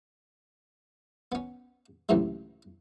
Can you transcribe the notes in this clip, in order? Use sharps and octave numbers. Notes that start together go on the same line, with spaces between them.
B3 C#4
C#2 A2 C3 E3 F#3 G#3